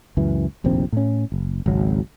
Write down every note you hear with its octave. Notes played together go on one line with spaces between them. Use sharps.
C#2 F#2 E3
F1 A#1 D#2 C4
A2 C#4
F#1
G#1 C#2 F#3